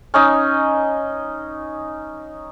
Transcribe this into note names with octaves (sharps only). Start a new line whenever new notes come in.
C#4 D#4 D#5